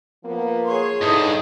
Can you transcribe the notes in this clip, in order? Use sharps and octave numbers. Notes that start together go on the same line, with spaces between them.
F3 A#3 B3
G#4 C#5 C6
G2 D3 D#4 E4 D#5